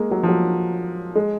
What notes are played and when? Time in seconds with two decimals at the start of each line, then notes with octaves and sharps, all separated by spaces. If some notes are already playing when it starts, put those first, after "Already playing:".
Already playing: G#3 A#3
0.11 F#3
0.23 F3
0.29 F#3
1.15 G#3